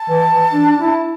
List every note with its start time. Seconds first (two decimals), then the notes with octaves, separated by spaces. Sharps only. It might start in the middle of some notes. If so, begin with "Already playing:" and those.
Already playing: A5
0.09 E3
0.30 E3
0.53 D4
0.76 D4
0.81 E4